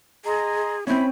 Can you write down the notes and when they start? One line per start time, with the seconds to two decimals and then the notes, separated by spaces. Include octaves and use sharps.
0.25 G#4 D#5 A#5 C6
0.87 C4 C#4 E4 B5